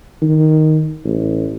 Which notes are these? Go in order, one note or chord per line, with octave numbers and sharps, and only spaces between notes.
D#3
A1